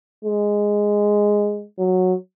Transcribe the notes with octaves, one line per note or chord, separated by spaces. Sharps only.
G#3
F#3